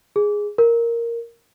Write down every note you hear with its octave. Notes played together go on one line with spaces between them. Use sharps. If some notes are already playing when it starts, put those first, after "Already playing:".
G#4
A#4